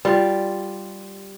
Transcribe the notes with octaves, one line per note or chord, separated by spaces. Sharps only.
G3 F4